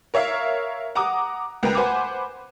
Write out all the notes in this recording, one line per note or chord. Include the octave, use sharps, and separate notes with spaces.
A#4 C#5 E5 F5 F6
F#5 A#5 D6 D#6
C#2 A#4 B4 G5
B4 C5 F#5 G#5 B5 D6